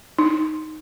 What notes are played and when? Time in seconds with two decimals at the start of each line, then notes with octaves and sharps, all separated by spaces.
0.19 D#4